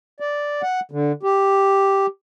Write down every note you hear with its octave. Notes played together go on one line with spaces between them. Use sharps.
D5
F#5
D3
G4